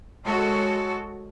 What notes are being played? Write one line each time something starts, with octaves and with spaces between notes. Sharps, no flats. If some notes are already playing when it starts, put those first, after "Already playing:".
G#3 F#4 A4 C#5